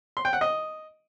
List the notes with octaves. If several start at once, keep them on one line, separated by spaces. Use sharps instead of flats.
C6
G5
F#5
D#5